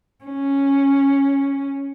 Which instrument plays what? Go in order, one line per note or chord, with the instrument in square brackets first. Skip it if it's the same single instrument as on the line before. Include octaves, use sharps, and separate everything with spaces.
[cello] C#4